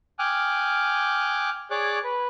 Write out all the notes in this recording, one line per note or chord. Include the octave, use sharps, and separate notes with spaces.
G5 G#5 D6 D#6 F6 F#6
G#4 C#5 D5 D6 F#6
B4